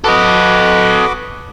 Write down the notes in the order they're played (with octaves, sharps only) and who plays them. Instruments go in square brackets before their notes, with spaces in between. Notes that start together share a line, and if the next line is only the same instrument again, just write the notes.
[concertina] F#4 B4 D6 [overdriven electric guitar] A4 D#5